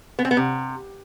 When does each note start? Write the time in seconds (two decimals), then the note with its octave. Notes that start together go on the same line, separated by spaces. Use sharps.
0.19 B3
0.25 C4
0.31 B3
0.37 C3